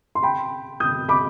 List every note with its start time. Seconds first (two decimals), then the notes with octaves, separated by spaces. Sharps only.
0.15 C6
0.23 G5 B5
0.80 D#6 G6
1.09 B5 D6